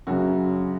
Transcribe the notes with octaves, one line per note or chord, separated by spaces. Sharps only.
F#2 C#3 F#3 F#4